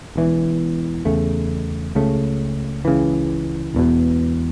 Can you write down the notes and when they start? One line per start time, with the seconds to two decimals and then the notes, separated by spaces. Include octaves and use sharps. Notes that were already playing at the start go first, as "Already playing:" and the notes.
0.16 E1 E2 E3
1.05 E2 C#3 A3
1.95 C#2 C#3 A3
2.85 C#2 C#3 E3
3.75 E1 E2 B2